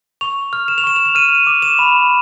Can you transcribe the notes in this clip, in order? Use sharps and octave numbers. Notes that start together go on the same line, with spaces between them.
C#6 F7
F6
E7
F7
C#6 E7
F7
E7
F6 D#7
D6
E7
B5